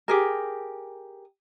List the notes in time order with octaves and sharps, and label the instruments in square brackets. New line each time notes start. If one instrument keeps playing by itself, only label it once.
[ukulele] G4 G#4 A#4